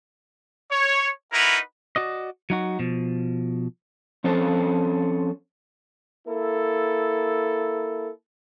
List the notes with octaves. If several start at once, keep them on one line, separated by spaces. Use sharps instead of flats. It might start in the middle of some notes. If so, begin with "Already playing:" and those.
C#5
D#4 E4 F#4 A#4 B4
F#4 D5 D#5
F#3 D#4 F#4
B2 F3
F3 C4 C#4 A4 C5
A#3 E4 A4